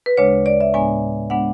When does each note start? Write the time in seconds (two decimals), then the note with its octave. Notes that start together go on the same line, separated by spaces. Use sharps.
0.06 B4
0.17 D2 C#3 G#3 D4 C#5
0.46 D5
0.61 E5
0.74 A2 G#3 B3 D4 G#5
1.30 G#3 B3 D4 F#5